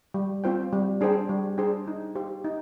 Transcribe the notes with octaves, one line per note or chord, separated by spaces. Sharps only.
G3
C4 F4 C5 G5
G3
D4 G#4 C5 G5
G3
D4 G#4 C5 G5
D#4
G4 C5 F5
D#4